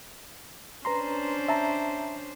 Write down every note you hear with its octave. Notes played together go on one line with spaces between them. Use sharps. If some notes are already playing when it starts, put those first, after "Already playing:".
C#4 D4 B4 C5 A#5 C6
E5 A5 A#5